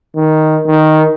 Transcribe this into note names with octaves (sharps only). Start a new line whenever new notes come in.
D#3
D#3